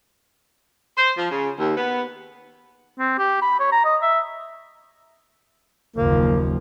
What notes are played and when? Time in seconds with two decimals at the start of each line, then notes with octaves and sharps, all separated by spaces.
0.97 C5
1.17 F3
1.30 C#3
1.58 D#2
1.77 B3
2.99 C4
3.18 G4
3.42 B5
3.59 C#5
3.72 A#5
3.84 D#5
4.02 E5
5.96 F#1 D#2 F3 A#3